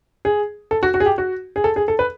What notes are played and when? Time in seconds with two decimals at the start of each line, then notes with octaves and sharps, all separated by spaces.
0.25 G#4
0.71 A4
0.83 F#4
0.94 F#4
1.00 G#4
1.06 G4
1.18 F#4
1.56 G#4
1.64 A4
1.76 G#4
1.88 A4
1.99 B4